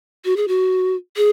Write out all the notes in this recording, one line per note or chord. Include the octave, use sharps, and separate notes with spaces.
F#4
G#4
F#4
G#4